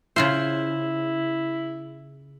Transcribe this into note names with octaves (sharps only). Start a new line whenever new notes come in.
C#3 E4 F4 C5